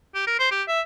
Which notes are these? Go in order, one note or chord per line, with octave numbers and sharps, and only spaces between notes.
G4
A#4
C5
G4
E5